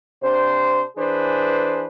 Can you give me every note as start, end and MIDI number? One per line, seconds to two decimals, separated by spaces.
0.22 0.83 48
0.22 0.83 62
0.22 0.83 72
0.97 1.85 52
0.97 1.85 62
0.97 1.85 68
0.97 1.85 71
0.97 1.85 72